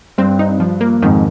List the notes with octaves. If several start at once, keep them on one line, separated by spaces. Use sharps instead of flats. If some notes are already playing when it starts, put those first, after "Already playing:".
G2 C4
D#4
F3
A#3
F2 G#2 D#3